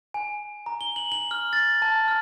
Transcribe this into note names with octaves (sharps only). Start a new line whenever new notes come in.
G#5
A#5
G7
F#7
F#7
F6
A6
A5
F6